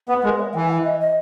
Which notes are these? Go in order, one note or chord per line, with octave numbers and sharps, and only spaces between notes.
B3 B4
G#3 A#4
E5
E3 G#5
E5
D#5
D#5